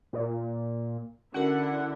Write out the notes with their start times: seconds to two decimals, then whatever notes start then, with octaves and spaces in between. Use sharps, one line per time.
0.13 A#2
1.34 D3 C#4 E4 F#4 A#4 F#5